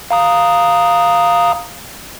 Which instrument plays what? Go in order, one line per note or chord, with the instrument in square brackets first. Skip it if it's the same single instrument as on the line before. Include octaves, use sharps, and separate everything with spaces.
[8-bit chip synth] F5 A#5 D#6